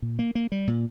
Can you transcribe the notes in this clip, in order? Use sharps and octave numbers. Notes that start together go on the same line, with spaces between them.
A#2
A#3
A#3
G3
A#2